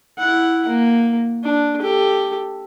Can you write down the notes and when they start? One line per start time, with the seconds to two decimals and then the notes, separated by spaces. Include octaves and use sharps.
0.18 E4 F#5
0.68 A#3
1.44 D4
1.81 G4 A4